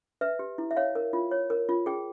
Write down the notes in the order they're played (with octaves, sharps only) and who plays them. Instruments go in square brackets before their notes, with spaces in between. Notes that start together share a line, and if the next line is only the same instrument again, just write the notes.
[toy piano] B4 E5
G4
E4
E5
C#5 F5
A#4
F4
C#5
A#4
F4
G#4 G5